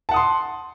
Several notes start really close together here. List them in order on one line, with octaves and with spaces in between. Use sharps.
A5 F#5 D#6 C6